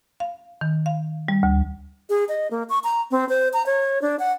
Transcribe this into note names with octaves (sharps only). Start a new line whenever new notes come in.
F5
D#3
F5
G3
D2
G#4
D#5
A#3
C#6
A#5
C4
C5
A#5
C#5
D4
F#5